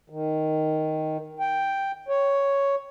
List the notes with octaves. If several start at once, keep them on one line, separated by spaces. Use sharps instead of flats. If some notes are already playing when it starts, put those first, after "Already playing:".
D#3
G5
C#5